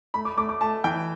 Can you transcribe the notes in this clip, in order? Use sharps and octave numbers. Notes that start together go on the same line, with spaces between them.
A3 B5
D6
A3 D6
D6
A3 A5
E3 G5